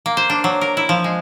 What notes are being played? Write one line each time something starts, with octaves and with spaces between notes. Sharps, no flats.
A#3
C5
D4
F#3
A#4
E4
F3
G#3